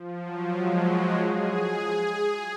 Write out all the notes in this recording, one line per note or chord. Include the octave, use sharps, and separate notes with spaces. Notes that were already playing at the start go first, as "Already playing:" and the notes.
Already playing: F3
F#3
G#3
F#4
G#4